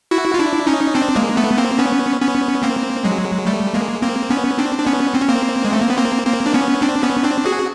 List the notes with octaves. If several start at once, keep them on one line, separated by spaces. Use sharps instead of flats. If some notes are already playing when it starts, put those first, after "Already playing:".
E4 F#4
F4
D4 E4
C#4 D#4
C4 D4
G#3 A#3
A3 B3
A#3 C4
B3 C#4
B3 C#4
A#3 C4
F#3 G#3
G3 A3
G#3 A#3
A#3 C4
B3 C#4
C4 D4
D4
B3 C#4
C4
C#4
A#3 C4
G#3
A3
A#3
B3
A#3 C4
A#3 C4
D4
B3 C#4
C4 D4
B3 C#4
C4 D4
F#4 G#4